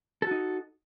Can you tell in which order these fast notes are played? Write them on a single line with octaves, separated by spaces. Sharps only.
A4 F#4 D#4